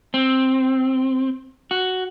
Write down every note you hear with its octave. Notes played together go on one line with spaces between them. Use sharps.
C4
F#4